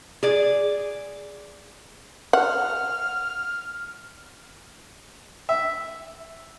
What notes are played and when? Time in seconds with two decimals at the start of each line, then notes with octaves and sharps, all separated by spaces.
0.23 G#4 D5
2.33 F#5 F6
5.49 E5